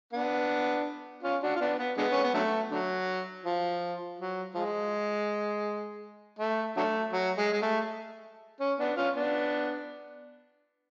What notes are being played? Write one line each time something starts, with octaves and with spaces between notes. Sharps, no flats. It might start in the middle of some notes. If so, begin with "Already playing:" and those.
B3 D4
C#4 F4
D4 F#4
F4
B3 D4
B3
D3 G#3 B3
C#4
B3
D3 F#3 A3
D3 F#3
F3
F#3
F3 G#3
A3
D3 F#3 A3
F#3
G#3
G#3
A3
C#4
B3 D4
C#4 F4
B3 D4